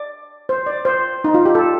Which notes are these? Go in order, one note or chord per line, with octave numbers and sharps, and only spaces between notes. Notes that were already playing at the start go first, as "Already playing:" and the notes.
Already playing: D5
C5
D5
C5
D#4
F4
G4
A4